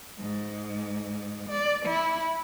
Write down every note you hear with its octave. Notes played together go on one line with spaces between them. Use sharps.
G#2
D5
E4